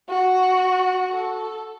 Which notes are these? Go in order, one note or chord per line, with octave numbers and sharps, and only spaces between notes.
F#4
A4